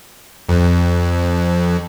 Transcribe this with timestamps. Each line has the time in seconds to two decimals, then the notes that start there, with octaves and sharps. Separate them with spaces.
0.49 F2